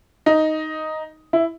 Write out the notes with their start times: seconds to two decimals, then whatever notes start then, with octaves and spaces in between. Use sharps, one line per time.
0.26 D#4
1.33 E4